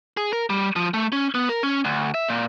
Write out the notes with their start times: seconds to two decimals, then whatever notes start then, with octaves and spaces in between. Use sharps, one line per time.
0.17 G#4
0.33 A#4
0.50 G3
0.76 F3
0.94 A3
1.12 C#4
1.35 B3
1.49 A#4
1.63 C#4
1.85 D2
2.14 E5
2.29 A#2